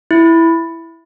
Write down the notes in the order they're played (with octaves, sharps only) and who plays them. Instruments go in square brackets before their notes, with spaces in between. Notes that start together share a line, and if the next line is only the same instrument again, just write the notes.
[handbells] E4